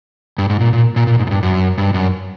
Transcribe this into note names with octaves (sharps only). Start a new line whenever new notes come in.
G2
G#2
A#2
A#2
A#2
A#2
G#2
F#2
G2
F#2
G2
F#2